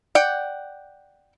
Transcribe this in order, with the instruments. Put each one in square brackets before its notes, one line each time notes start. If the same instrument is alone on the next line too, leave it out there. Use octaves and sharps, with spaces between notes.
[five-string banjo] D5 F#5 G5